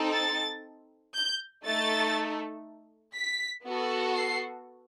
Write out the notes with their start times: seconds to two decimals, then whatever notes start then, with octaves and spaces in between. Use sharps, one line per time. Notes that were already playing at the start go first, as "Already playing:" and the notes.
Already playing: C4 D#4 A4
0.13 A6
1.14 G6
1.64 A3 D#4 A4 A6
3.15 B6
3.65 B3 F#4 A4
4.15 C7